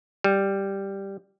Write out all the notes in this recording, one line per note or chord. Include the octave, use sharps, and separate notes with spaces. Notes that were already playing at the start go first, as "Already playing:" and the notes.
G3